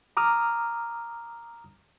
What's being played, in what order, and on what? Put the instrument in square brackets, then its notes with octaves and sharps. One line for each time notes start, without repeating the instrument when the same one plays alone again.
[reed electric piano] A#5 D6 D#6 F6